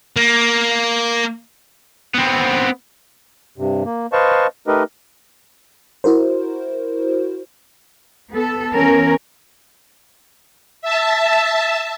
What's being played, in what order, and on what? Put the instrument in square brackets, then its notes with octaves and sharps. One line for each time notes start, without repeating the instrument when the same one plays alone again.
[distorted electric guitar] A#3
[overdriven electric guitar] B3 C4
[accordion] G2 C3
A#3
B4 C5 D#5 F5 A5 C#6
A3 D#4 G4 A#4 B4 D#5
[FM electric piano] E4 F#4 A#4 C5
[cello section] B3 A4
E3 B3 C#4 A#4
[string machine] E5 A5